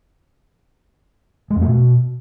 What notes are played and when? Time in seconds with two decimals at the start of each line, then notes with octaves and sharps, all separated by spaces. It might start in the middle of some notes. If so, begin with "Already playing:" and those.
1.50 G#3
1.56 F2
1.62 A3
1.67 B2